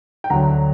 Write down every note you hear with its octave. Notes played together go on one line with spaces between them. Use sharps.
G5
D2 D3 F#3 F#5 A#5